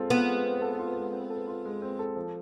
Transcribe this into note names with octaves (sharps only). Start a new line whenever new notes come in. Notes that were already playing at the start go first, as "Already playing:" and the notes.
Already playing: G#3 C4 F4 A4
B3 F4
G#3
C4
A4
F4
G#3
C4
A4
F4
G#3
C4
A4
F3